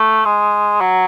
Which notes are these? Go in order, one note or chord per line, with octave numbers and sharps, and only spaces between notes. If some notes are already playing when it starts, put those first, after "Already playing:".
Already playing: A3
G#3
F#3